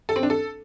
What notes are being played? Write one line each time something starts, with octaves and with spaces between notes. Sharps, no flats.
A4
C4
D4
A4